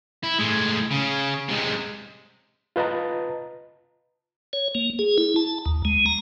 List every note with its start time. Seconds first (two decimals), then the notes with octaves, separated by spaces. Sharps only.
0.24 E4
0.39 A2 G#3
0.91 C#3
1.48 C3 G#3
2.76 F4 B4 D#5 A5 A#5
4.53 C#5
4.75 A#3
4.99 G#4
5.18 E4
5.36 A5
5.66 D#2
5.85 G#3
6.06 A#5